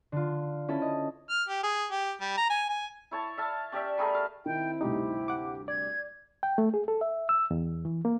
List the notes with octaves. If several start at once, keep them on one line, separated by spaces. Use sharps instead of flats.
D3 F4
C#4 E4 A4
D#5
F6
G4
G#4
G4
G3
A#5
G#5
G#5
E4 C#5 A5
E5 F5 A5
C#4 G4 D5 E5
G3 A3 G#4 A#4
F5
D#3 C4 E4 G5
D2 G2 C3 D#4 G4
F#5 D6
D5 G#6
G5
A3
G#4
A4
E5
E6
E2
E3
A#3